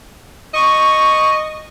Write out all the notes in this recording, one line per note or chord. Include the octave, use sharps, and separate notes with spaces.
D#5 C#6